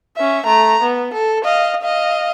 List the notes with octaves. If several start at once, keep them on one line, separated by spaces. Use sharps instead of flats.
C#4 E5
A3 A#5
B3
A4
D#5 F5
D#5 F5